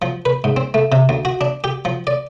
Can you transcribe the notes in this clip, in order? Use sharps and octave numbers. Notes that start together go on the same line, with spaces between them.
F3
B4
G#2
C4
A3
C3
D2
F#4
D4
G4
F3
D5